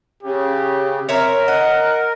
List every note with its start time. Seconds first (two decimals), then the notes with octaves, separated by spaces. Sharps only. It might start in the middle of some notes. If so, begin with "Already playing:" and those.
0.23 C#3 G4
1.09 C4 A#4 C#5 E5 A#5
1.48 D#5 F#5